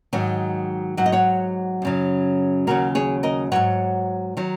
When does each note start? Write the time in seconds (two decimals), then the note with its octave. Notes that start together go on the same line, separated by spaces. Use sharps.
0.13 G#2 D#3 F#3
0.97 G#2 F#3 F#5
1.06 D#5
1.12 C#5 F#5
1.82 F#2 C#3 F#3
2.67 D#2 C#3 F#3 F#4 A#4
2.95 G#4 C#5
3.23 A#4 D#5
3.52 G#2 F#3 C#5 F#5
4.37 D#3 F#3